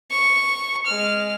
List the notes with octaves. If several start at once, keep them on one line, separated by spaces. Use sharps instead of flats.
C#6
G#3 F6